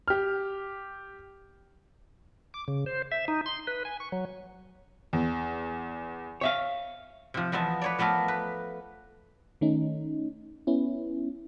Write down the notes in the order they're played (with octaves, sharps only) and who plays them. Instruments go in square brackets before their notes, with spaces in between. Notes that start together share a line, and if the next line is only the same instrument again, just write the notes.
[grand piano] G4 F6
[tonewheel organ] D6
C#3
C5
E5
D#4
C6
B4
G#5
C#6
F#3
[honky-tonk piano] E2
[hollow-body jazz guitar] C#5 E5 F5
[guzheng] C3 F3
E2 F3 B3 D#5 E5 A5
B4 C#5 D5
F3 A3 B3 A4 A#4
B4
[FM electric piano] D#3 A3 C#4 D#4
B3 C#4 E4